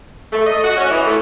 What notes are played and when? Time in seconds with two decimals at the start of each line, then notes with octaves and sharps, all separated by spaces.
0.33 A3
0.47 D#5
0.64 F#4
0.77 C#4
0.90 E3
1.07 A3